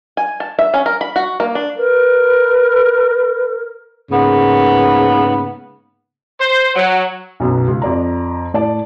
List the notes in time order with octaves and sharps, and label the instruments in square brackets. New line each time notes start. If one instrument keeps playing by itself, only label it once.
[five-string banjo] G#5
A5
E5
C#4
A#4
B5
F#4
A#3
D4
[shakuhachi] A#4 [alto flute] B4
[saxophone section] G#2 C#3 A#3 B3
[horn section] C5
F#3
[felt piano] B1 F#2 B2
C#2
F2 D5 A#5
A2 D5 A5